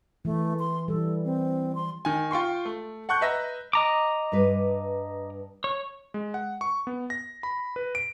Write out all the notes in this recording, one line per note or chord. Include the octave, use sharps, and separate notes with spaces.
E3 A3
C6
E3 G3 A4
C4
C6
D#3 G#5
F4 G5 C6 C#6
A3
F#5 A5 C#6 F#6 G6
B4 D#5 E5 A#5 A#6
D#5 A#5 D6
G2 B4
C#5
G#3
F#5
C#6
B3
A#6
B5
B4
D7